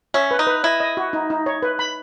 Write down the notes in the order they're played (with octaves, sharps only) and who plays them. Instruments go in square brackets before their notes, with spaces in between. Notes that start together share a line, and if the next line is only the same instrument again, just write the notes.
[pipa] C#4 [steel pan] E5
[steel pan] B4
[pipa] D#4
[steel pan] B4
[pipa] E4 [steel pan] D#5
[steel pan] D#5
F#4
D#4
D#4
C#5
B4
B5